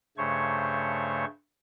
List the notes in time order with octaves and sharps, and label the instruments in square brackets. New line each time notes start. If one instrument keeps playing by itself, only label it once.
[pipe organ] G2 C#3 A3 C5 C#5 C#6